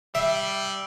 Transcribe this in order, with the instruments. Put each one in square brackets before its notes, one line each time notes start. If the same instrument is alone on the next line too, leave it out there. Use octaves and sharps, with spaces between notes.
[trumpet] G3 [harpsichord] E5 [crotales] E6 C7 D7